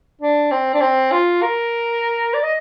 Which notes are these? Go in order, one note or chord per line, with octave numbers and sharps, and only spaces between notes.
D4
C4
D4
C4
F4
A#4
D5
D#5